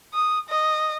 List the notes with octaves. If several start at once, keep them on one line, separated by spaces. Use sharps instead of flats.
D#6
D#5